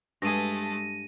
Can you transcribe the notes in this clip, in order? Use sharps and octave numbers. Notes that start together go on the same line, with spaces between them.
G2 G#3 A3 G#4 A5 A#6 D#7